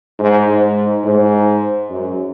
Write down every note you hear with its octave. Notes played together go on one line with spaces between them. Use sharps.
G#2
G#2
G#2
F#2